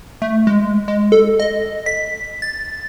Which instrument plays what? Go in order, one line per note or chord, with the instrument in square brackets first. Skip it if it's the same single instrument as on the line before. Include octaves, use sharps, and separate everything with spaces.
[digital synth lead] A3
G#3
G#3
A4
D#5
B6
A6